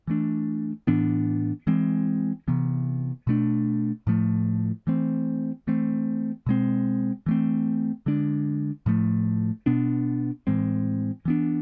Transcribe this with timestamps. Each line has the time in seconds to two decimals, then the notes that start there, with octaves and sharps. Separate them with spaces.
0.07 E3 A3 D4
0.87 A2 E3 B3 D4
1.67 E3 G#3 C4
2.48 C3 E3 B3
3.27 B2 A3 D4
4.07 A2 F3 A3
4.87 E3 A3 C4
5.67 E3 A3 C4
6.47 B2 G#3 C4
7.26 E3 A3 C4
8.06 D3 G#3 D4
8.86 A2 F3 A3
9.66 B2 B3 D4
10.47 A2 E3 G#3 C4
11.25 E3 B3 D4